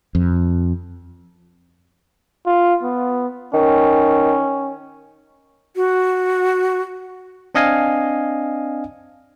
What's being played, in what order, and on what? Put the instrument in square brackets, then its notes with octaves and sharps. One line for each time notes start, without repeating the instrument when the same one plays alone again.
[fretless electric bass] F2
[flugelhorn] F4
B3
[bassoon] D#3 [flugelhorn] C#4
[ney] F#4
[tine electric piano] C4 D4 D#5 F5 G#5